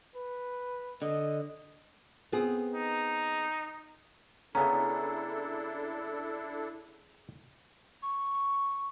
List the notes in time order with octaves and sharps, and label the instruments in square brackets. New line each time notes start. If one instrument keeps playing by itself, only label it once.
[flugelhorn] B4
[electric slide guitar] D3 [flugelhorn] D#5
[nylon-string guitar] B3 C4 G#4
[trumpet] D#4
[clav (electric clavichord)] C#3 B3 C#4 [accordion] D4 E4 A4 [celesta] A#5
[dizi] C#6